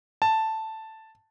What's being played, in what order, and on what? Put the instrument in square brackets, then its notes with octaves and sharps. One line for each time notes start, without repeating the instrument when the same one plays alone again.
[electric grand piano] A5